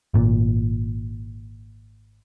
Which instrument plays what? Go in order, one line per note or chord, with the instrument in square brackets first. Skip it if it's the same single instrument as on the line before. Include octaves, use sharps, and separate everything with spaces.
[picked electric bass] G#1 A#2